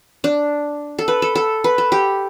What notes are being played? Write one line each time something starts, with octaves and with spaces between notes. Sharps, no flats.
D4
A4
B4
A4
A4
B4
A4
G4